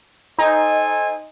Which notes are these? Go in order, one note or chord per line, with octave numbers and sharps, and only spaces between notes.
D#4 A4 C5 G#5